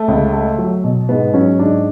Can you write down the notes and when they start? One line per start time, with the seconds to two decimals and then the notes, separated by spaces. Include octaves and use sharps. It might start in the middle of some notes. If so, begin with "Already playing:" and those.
Already playing: A3
0.08 C#2
0.33 A3
0.58 F#3
0.84 B2
1.09 G#2 B3
1.34 F#3 C#4
1.59 G#2 D4